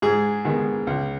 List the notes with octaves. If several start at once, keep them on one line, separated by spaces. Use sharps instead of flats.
G#2 G#4
D#3 G#3 B3
C#2